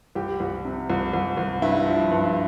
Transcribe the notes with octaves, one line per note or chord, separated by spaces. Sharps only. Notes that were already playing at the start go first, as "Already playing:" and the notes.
C2 G4
C2
C3
C2
C2
C2
G2 E4
F3
G2